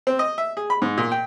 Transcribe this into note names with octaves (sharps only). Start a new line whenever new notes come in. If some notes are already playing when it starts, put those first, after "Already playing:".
C4
D#5
E5
G#4
B5
G#2
A#2
G5